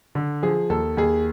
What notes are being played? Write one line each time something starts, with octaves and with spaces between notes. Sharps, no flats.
D3
F3 G#4
D#2 A4
D#2 G#4